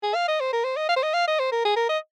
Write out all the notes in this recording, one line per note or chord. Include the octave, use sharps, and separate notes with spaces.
G#4
F5
D#5
C5
A#4
C5
D#5
F5
C5
D#5
F5
D#5
C5
A#4
G#4
A#4
D#5